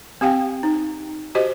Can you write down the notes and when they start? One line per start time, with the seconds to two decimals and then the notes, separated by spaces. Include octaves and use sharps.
0.21 C4 G4 F5 G5
0.63 D#4
1.35 F#4 G4 C5 D#5